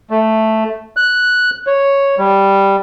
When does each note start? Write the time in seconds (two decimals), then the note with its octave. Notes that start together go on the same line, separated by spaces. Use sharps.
0.10 A3
0.97 F#6
1.67 C#5
2.18 G3